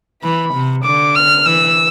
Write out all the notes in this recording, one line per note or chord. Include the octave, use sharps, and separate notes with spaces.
E3 B5
C3
D3 D6
F6
E3 E6